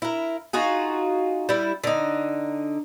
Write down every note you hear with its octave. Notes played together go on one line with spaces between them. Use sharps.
E4 A#4
D#4 F4 F#4 G#4
G3 E4
D3 D#4